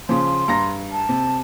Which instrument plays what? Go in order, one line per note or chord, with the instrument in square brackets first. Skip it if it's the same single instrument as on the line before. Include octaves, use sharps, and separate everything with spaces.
[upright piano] C#3 F3 [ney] C6
[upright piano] G2 A#5 A#6
[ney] A5
[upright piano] C3